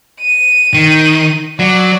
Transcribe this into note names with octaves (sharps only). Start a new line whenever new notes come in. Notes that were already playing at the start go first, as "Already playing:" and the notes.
D#7
D#3
F#3 D5